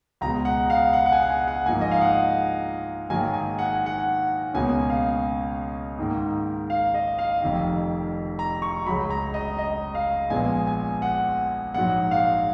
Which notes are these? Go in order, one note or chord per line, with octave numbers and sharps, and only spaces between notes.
C#2 B2 G#3 A#5
F#5
F5
F#5
F#5
G#5
F#5
G#5
F#5
G#2 F3 A#3 G#5
D#5
F5
F#5
G#2 D#3 F#3 A#3 G#5
G#5
F#5
G#5
F#5
C#2 B2 A#3 C#4 G#5
F5
G#2 D#3 A#3
F5
D#5
F5
F1 F2 D#3
A#5
C#6
C#2 C#3 F#3 B5
A#5
D#5
D#5
F5
A#1 A#2 G#3 B3 G#5
G#5
F#5
A#1 G#2 F#3 F#5
F5